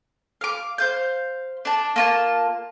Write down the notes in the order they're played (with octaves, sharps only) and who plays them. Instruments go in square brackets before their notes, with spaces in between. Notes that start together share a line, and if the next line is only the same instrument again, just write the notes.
[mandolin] F5 D6
C5 F5 G6
D4 A5
A#3 F4 A5